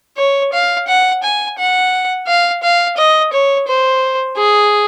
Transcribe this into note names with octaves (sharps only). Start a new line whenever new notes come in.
C#5
F5
F#5
G#5
F#5
F5
F5
D#5
C#5
C5
G#4